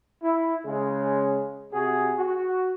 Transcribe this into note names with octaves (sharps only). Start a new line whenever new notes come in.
E4
C#3 G#3
C3 F#4 G#4
F#4